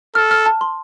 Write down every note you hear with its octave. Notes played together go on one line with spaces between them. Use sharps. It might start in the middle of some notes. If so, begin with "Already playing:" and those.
A4 F6
F6
A5
C6